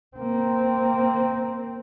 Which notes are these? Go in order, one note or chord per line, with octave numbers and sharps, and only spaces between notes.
A#3 C4